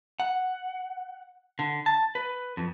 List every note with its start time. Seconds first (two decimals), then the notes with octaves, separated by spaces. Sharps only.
0.20 F#5
1.59 D3
1.86 A5
2.15 B4
2.57 F2